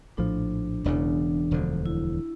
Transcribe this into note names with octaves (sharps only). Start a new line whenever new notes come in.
A#1 A2 F3 D4
E1 E2 C#3 D4
E1 D2 D3 F3
E4